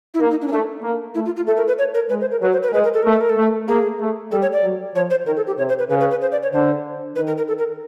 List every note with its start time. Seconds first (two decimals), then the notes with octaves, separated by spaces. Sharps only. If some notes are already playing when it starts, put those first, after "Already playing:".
0.14 E4
0.20 A#3 D#4
0.30 D#4
0.41 D4
0.48 C#4
0.52 A3 D4
0.83 A#3
1.15 A3 E4
1.26 F4
1.36 F4
1.47 A3 A4
1.57 A#4
1.67 B4
1.78 C#5
1.94 A#4
2.09 G#3 B4
2.21 C5
2.31 A#4
2.41 F#3 B4
2.52 C5
2.63 B4
2.69 A#4
2.73 G#3 B4
2.84 A#4
2.94 A4
3.03 A3 A#4
3.12 A4
3.21 A#4
3.29 A4
3.37 A3
3.68 A#3 G#4
4.00 A3
4.31 G3 A4
4.42 C#5
4.53 D5
4.63 F#3
4.95 F3 C#5
5.10 C5
5.26 D#3 A#4
5.37 A4
5.47 G4
5.58 C3 C#5
5.69 C5
5.79 B4
5.90 C#3 B4
6.00 B4
6.11 B4
6.22 C5
6.32 D5
6.43 C#5
6.53 D3 C5
7.16 D#3 B4
7.27 A#4
7.37 A#4
7.48 A4
7.58 A#4